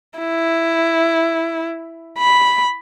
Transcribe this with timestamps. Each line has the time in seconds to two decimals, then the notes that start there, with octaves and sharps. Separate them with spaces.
0.19 E4
2.19 B5